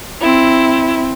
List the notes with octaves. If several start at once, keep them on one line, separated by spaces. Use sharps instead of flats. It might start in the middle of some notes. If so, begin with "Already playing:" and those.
C4 E4